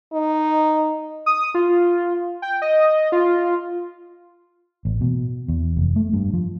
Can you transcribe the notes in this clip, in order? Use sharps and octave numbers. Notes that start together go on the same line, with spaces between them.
D#4
D#6
F4
G5
D#5
F4
A1
B2
E2
F1
A3
G2
F3